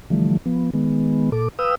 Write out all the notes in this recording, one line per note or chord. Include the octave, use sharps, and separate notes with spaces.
D3 E3 F3 G3 A3
F3 B3
D#3 G#3 B3
A#2 A4 D6
B4 F5 G5 D#6 E6